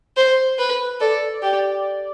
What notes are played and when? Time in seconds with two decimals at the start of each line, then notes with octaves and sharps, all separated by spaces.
0.17 C5
0.58 B4
1.00 A4 D5
1.42 G4 D5